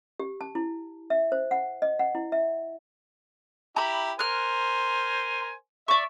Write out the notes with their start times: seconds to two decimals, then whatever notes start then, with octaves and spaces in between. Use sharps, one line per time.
0.20 G4
0.41 A5
0.55 E4
1.10 E5
1.32 C5
1.51 F#5
1.82 D#5
1.99 F#5
2.15 E4
2.32 E5
3.76 E4 G4 A#5 B5
4.19 A#4 C5 G#5 F6 F#6
5.88 D5 E5 C#6